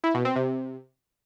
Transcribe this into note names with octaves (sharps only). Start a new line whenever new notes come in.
E4
B2
C4
C3